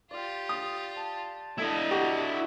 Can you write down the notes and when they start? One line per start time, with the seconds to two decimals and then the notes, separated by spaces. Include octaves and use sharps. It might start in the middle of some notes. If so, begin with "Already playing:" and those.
0.11 F4 G4 D5 F5
0.49 D#6
0.96 A5
1.58 D4 E4 A4 D#5 A5
1.91 F#4 G4